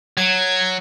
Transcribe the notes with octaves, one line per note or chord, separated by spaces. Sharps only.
F#3 G#6